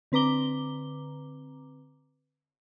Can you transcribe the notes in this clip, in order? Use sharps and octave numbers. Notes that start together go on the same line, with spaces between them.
D3 C4 B4 A#5 D6 G7